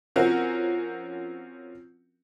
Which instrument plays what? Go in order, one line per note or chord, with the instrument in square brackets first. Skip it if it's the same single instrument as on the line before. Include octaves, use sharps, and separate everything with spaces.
[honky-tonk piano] F3 C4 C#4 F#4 A#4